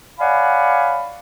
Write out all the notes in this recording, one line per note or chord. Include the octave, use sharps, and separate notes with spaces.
C#5 D5 F5 F#5 G#5 B5